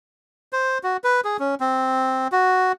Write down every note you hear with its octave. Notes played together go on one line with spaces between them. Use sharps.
C5
F#4
B4
G#4
C#4
C4
F#4